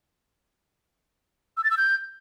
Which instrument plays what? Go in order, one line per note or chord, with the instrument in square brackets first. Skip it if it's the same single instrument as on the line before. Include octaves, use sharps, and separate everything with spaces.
[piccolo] E6
A6
E6
G6